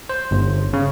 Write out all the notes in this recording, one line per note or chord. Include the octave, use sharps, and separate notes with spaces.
C5
G1
C#3